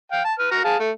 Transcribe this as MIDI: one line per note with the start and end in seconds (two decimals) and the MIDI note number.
0.12 0.22 77
0.12 0.22 79
0.25 0.34 81
0.39 0.50 71
0.39 0.50 89
0.51 0.63 66
0.51 0.63 82
0.51 0.63 89
0.64 0.77 68
0.64 0.77 77
0.64 0.77 81
0.79 0.91 57